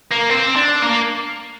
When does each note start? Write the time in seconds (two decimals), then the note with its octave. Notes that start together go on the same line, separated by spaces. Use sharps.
0.11 A#3
0.29 C4
0.56 D4
0.82 A#3